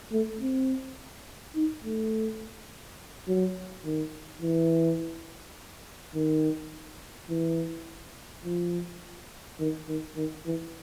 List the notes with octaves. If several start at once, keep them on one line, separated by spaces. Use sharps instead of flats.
A3
C4
D#4
A3
F#3
D#3
E3
D#3
E3
F3
D#3
D#3
D#3
E3